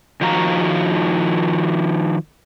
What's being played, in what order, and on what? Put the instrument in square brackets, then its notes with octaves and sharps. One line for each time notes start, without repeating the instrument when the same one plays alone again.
[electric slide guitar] D#3 F3 F#4 F5 A#5